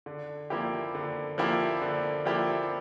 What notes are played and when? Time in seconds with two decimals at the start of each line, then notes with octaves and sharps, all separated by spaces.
0.06 D3
0.50 F3 A#3 E4 G4
0.95 D3
1.38 F3 A#3 E4 G4
1.82 D3
2.26 F3 A#3 E4 G4